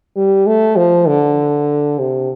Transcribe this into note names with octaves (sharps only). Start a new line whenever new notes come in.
G3
A3
F3
D3
C3